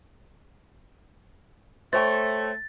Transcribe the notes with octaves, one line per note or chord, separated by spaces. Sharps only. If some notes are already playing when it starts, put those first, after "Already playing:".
A3 C5 C#5 G5 A6